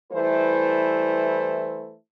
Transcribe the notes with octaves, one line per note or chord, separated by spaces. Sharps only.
E3 G3 A3 E4 B4 C5